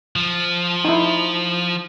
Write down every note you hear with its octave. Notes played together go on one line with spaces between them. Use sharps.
F3
D#4 E4